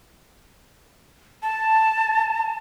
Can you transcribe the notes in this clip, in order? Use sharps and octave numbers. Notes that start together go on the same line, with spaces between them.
A5